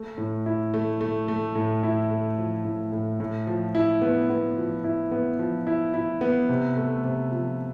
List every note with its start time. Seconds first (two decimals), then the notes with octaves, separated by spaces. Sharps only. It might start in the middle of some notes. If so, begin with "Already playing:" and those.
Already playing: A3
0.18 A2
0.46 E4
0.74 A3
1.01 A3
1.28 A3
1.55 A2
1.83 E4
2.10 A3
2.38 F3
2.65 A2
2.92 A2
3.20 A2
3.47 F3
3.75 E4
4.02 B3
4.30 B3
4.57 F3
4.84 E4
5.12 B3
5.39 F3
5.67 E4
5.94 E4
6.21 B3
6.49 C3
6.77 A3
7.04 C3
7.31 F3